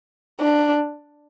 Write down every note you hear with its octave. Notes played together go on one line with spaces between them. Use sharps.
D4